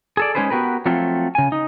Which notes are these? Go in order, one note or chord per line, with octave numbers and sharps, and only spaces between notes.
G#4 A4 D5
G#3 C#4 D#4 G#4 B4 C5
B3 F#4 G4 A#4 B4
F3 F#3 A3 C4 F4
C#3 G#5
D#4